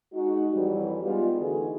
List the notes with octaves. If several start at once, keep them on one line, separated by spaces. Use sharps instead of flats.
G#3 D#4 F#4
F2 E3 F#3 G3
G3 G#3 B3 D#4 F4
D3 E3 A3 D#4 F#4 G#4